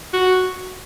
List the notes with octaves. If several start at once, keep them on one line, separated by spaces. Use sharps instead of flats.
F#4